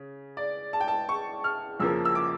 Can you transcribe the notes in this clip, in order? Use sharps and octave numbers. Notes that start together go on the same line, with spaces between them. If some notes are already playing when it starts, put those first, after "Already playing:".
Already playing: C#3
D5
A5
G5
A5
C#6
F6
F2 C#3 F3 A#3 E6
E6
D6